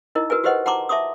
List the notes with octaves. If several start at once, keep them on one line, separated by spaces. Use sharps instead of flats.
D#4 E4 A#4 D#5
F#4 A#4 B4 G#5
F#4 G4 B4 C5 D#5 F#5
F#5 A5 A#5 C6 D6
E5 A5 C6 D6 D#6